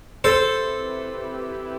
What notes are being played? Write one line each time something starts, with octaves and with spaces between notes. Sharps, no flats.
C4 E4 G4 A4 B4 C5